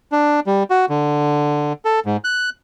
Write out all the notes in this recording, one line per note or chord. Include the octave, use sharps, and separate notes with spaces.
D4
G3
F#4
D3
A4
G#2
F#6